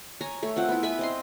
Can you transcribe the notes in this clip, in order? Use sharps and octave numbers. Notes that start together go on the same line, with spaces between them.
C#5 G#5 A#5
A3 C#5
C4 F4 F#5
B3 E4
B4 E5 G#5 B5
C4 D#5 C6